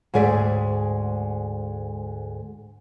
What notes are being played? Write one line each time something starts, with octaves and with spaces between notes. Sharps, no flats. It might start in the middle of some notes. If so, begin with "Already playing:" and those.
D2 G#2 G#3 G#4 D5 E5